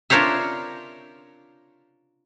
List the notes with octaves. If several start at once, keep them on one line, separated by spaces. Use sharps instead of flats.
D4 F4 A#4 C5 C#5 E5